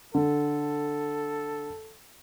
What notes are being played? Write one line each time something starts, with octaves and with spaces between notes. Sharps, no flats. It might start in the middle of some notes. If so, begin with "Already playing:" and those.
D3 A4